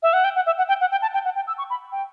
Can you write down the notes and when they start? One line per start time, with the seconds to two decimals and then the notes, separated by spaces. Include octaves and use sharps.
0.03 E5
0.13 F#5
0.24 G5
0.36 F#5
0.46 E5
0.58 F#5
0.68 G5
0.81 F#5
0.91 G5
1.02 A5
1.14 G5
1.25 F#5
1.36 G5
1.47 E6
1.58 C#6
1.70 B5
1.92 G5